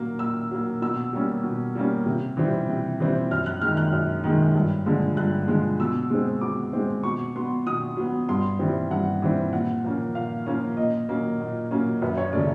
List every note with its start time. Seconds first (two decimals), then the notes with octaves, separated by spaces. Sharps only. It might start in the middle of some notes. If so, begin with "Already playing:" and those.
Already playing: A#2 F#3 A#3
0.19 A#2 E6
0.51 F#3 A#3
0.82 B2 E6
1.13 G3 A#3 C#4
1.44 B2
1.75 G3 A#3 C#4
2.06 C3
2.37 E3 G3 C4
2.69 C3
3.00 E3 G3 C4
3.31 F#2 F6
3.46 F#6
3.62 D#3 G#3 F6
3.77 F#6
3.93 F#2
4.24 D#3 G#3
4.55 G2
4.86 D3 F3 G#3
5.17 G2 F#6
5.48 D3 F3 G#3
5.80 B2 E6
6.10 G#3 C4
6.41 B2 D6
6.73 G#3 C4
7.03 B2 C#6
7.36 F#3 B3 C6
7.66 B2 D#6
7.97 F#3 B3
8.29 G2 C6
8.59 E3 G3 C4
8.91 G2 F#5
9.22 E3 G3 C4
9.53 A#2 F#5
9.84 F3 A#3 C#4
10.15 A#2 F5
10.46 F3 A#3 C#4
10.77 A#2 D#5
11.09 F#3 A#3 C#4
11.40 A#2
11.71 F#3 A#3 C#4
12.02 F#2 B4
12.18 C#5
12.32 C#3 F#3 A3 C#4 D5